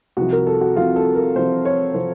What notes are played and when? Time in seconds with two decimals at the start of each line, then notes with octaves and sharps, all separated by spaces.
0.17 C2 C3 F3 F#4
0.32 A#4
0.47 A4
0.61 F#4
0.76 C2 C3 F3 F4
0.96 A4
1.15 A#4
1.35 C2 C3 F3 C5
1.65 C#5
1.94 C3 F3 C5